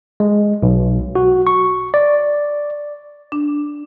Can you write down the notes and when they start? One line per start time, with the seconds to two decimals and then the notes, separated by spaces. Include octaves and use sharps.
0.20 G#3
0.63 B1
1.15 F#4
1.47 C#6
1.94 D5
3.32 D4